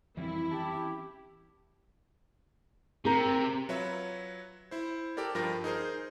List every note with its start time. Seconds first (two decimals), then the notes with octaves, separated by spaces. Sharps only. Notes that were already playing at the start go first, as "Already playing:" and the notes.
0.17 F2 D#3 E3 G3 C4 E4
0.51 C#4 G4 A5
3.05 C3 G4 A#4
3.69 F#3 F4 B4 C#5 E5
4.71 E4 C5
5.17 G4 A4 A#4 D5
5.35 G2 F3 F4 A#4 G5 A#6
5.64 D#4 G#4 A#4 C5